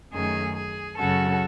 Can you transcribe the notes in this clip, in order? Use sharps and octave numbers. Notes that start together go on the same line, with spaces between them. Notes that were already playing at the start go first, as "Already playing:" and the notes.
F#2 D#3 A3 C#4 G#4
G#4
F#2 C#3 F#3 C#4 F#4 A4